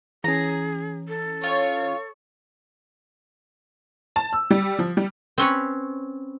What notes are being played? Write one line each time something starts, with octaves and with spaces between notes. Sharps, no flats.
E3 C#4 G#4 A#5
A4
F4 C#5
A5
E6
G3
F3
G3
C4 C#4 B4 C#5